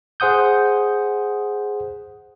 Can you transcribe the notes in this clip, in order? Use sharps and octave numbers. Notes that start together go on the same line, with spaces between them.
G#4 C5 F#5 D#6 G6